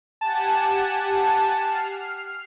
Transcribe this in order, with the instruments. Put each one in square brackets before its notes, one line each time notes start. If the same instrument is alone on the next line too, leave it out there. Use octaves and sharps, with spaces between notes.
[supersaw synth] G4 F#5 G#5 [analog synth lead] A5
[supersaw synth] F6 C7